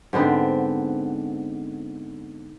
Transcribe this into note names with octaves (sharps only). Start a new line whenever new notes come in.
G#2 D3 B3 C4